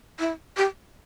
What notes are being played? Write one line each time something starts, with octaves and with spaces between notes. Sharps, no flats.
E4
G4